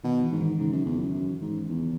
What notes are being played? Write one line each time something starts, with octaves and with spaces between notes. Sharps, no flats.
B2 D#3
E3
G#2
D#3
G#2 C#3
F#2
E2
F#2
F#2
G#2
E2